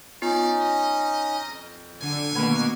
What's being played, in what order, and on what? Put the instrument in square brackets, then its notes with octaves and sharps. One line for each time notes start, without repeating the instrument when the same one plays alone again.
[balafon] B3 F4 [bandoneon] C#4 D#4 [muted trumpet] D5
[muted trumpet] D#5
[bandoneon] F2
[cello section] D3 [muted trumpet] G#5
[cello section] B2 A#3 [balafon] D#3 A3